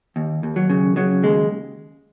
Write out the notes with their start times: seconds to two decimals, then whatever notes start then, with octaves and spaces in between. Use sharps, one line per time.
0.16 D#2
0.43 D#2
0.56 F#3
0.70 C#3
0.96 C#3 F#3
1.23 D#2 G#3